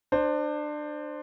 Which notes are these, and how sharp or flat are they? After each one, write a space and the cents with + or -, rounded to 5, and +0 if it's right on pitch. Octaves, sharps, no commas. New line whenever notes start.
D4 +25 C5 +0